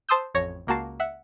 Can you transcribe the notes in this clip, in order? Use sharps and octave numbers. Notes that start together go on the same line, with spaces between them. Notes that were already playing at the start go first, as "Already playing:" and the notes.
C5 A5 C6 D#6 E6 G6
A1 F2 C#5 A#6
C#2 A#3 F#4 A5 C7
E5 F#5